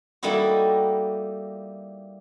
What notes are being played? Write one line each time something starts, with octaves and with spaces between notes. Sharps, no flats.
G3 A3 A#3 D#4 E4 F#4